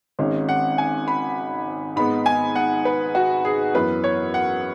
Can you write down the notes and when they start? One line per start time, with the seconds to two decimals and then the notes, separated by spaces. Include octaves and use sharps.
0.19 G#1 G#2 G#3 C#4
0.49 F#5
0.78 G#5
1.08 B5
1.96 G#2 G#3 B3 B5
2.26 G#5
2.56 F#5
2.85 B4
3.15 F#4
3.45 G#4
3.75 F#2 E3 B3 B4
4.04 C#5
4.34 F#5